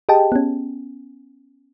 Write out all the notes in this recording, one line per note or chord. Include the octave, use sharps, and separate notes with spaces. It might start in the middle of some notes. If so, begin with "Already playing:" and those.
G4 G#4 D#5 G5 A5
B3 C#4